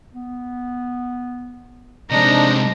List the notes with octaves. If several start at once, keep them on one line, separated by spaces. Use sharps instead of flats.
B3
C3 F3 G#3 D4 D#4 A#5